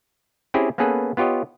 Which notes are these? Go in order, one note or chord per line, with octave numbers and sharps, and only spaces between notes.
C4 C#4 E4 G4 G#4
A#3 B3 C#4 G#4 A4 B4
B3 F4 G4 C#5 D#5